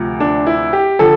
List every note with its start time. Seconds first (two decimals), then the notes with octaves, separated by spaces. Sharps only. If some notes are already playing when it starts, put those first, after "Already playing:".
Already playing: D2 C3 F3
0.20 D4
0.47 E4
0.73 G4
0.99 D3 F3 A4